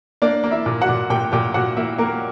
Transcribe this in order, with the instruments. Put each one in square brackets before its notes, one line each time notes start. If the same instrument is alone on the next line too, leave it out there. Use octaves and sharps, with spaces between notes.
[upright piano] A#3 D4 D5
A#3
E4 E5
A#2
F#4 F#5
A#2
A#2 G4 G5
A#2 G4 G5
A#2 F#4 F#5
A#3 E4 E5
A#3 A#4